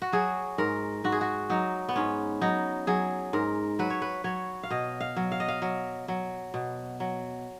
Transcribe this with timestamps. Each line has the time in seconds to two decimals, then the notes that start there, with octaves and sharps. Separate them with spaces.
0.02 F#4
0.13 F#3 G#4
0.58 G#2 A#4
1.04 G#2 F#4
1.12 G#4
1.21 F#4
1.50 F#3 D#4
1.89 B3
1.96 G#2 C#4
2.41 F#3 D#4
2.87 F#3 G#4
3.33 G#2 A#4
3.79 F#3 B4
3.90 C#5
4.02 B4
4.24 F#3 C#5
4.63 F5
4.70 B2 D#5
5.00 F5
5.16 F#3
5.32 F5
5.40 D#5
5.48 F5
5.62 F#3
6.08 F#3
6.54 B2
7.00 F#3